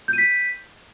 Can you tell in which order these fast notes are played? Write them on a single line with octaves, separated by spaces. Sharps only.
G6 D#7 B6